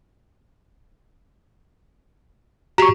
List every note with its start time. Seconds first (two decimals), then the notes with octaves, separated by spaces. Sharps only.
2.78 F#4 G4 A#5 C#6